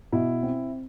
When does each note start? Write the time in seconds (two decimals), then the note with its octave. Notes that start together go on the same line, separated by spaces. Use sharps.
0.12 B2 E4
0.43 C4